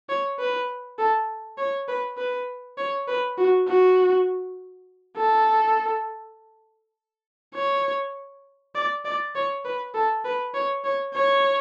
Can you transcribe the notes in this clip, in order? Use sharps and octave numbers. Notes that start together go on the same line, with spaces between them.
C#5
B4
A4
C#5
B4
B4
C#5
B4
F#4
F#4
A4
C#5
D5
D5
C#5
B4
A4
B4
C#5
C#5
C#5